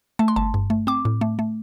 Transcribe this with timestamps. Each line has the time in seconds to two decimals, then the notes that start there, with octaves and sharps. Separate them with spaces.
0.19 A3 A5
0.28 C6
0.36 G1 A5
0.54 G2
0.70 A3
0.87 C4 D6
1.05 A2
1.21 A3
1.39 A3